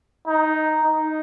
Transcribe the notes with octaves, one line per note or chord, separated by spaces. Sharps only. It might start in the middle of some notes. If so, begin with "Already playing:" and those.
D#4
D#4